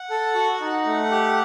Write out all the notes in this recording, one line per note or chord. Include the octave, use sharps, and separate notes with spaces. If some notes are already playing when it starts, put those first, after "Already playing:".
Already playing: F#5
A4
F#4
D#4
A3
G4